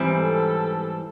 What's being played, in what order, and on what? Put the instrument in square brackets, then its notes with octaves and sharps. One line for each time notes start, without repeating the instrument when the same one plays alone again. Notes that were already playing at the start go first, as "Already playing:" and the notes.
Already playing: [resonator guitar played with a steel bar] G#2 E3 G3 C4
[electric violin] A4